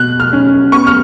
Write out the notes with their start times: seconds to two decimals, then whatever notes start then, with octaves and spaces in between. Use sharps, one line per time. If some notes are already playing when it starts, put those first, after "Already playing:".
Already playing: B2 F#6
0.20 F6
0.33 C#4
0.72 B3 C#6
0.87 F6